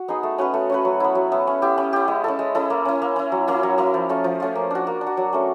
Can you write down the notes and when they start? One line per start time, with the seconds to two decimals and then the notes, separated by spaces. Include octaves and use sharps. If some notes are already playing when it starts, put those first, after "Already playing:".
Already playing: F#4
0.08 B3 D#4 G#4
0.23 A3
0.38 C#4 F#4 B4
0.54 A3
0.70 C#4 F#4 B4
0.85 F#3
1.00 B3 E4
1.15 F#3
1.32 B3 E4
1.47 C#4
1.62 E4 G4
1.78 C#4
1.93 E4 G4
2.08 G#3
2.24 C#4 E4 A4
2.39 G#3
2.55 C#4 E4 A4
2.70 A#3
2.85 C#4 E4
3.02 A#3
3.16 C#4 E4
3.32 F#3
3.48 A#3 C#4 E4
3.63 F#3
3.78 A#3 C#4 E4
3.94 F3
4.09 A3 C#4 F4
4.24 F3
4.40 A3 C#4 F4
4.55 A#3
4.71 D4 F#4
4.87 A#3
5.01 D4
5.07 F#4
5.17 F#3
5.33 A3 C#4